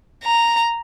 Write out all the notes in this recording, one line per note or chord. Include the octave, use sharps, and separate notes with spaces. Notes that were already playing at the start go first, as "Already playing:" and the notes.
A#5